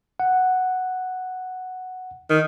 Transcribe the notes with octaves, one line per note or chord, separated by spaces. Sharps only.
F#5
D#3